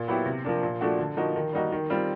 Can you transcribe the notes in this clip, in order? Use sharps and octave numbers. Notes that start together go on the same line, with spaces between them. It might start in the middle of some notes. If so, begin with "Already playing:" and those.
Already playing: A#2
F#3 B3 E4 G4
C3
F3 A#3 D4
A#2
F3 A3 D4 F#4
D3
F3 A#3 D#4 F#4
D#3
G3 A#3 D#4 F#4
D#3
G3 C4 F4